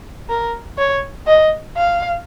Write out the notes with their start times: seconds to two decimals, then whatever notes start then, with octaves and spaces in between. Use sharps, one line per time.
0.30 A#4
0.78 C#5
1.27 D#5
1.77 F5